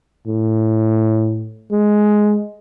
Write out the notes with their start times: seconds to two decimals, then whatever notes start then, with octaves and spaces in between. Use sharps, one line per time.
0.27 A2
1.71 G#3